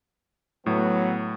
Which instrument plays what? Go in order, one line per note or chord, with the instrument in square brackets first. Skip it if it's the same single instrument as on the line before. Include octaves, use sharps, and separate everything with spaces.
[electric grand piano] A2 [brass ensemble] F#3 B3